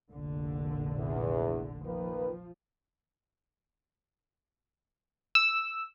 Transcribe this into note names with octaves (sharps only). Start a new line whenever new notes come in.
F1 A#1 D3
E2
D#3 F3 A#3 B4
E6